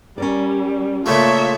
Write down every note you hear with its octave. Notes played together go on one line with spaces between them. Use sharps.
G3 C#4 A#4 D5
A#2 C#3 A3 F4 A4 C#5 E5